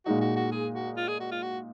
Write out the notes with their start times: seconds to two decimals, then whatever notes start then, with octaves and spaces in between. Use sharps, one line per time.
0.06 A#2 G#3 D#4 F#4
0.21 F#4
0.36 F#4
0.51 G#4
0.74 F#4
0.97 F4
1.08 G#4
1.20 F#4
1.32 F4
1.43 F#4